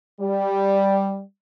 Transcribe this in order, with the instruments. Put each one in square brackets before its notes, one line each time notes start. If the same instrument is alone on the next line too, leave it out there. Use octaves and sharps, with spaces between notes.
[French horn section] G3